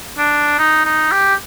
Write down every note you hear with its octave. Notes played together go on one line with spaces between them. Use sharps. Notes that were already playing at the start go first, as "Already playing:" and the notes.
D4
D#4
D#4
G4